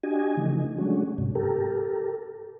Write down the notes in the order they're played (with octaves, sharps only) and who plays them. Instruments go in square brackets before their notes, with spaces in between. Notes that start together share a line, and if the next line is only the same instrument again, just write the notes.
[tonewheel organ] D4 F#4 G4 D#5 G#5
C#3 E3 F3 A3 D#4
F#3 G#3 A3 C#4 D4 F#4
G#2 C3
G4 A4 A#4